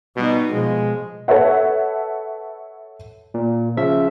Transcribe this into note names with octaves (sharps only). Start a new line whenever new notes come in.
B2 G3 D#4
B2 F3 G#3
A4 B4 C#5 E5 F#5
A#2
C#3 F3 E5